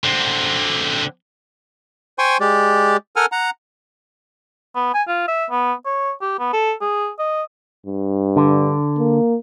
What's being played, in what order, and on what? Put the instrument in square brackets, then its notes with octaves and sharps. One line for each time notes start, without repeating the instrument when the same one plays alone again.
[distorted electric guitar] D3 C4
[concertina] C5 G5 G#5 C6 C#6
G#3 G4 D5
A4 A#4 F#5 G#5 F6
F#5 A#5
[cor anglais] B3
G#5
F4
E5
B3
C#5
G4
B3
A4
G#4
D#5
[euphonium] G2
[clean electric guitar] D3
[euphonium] A#3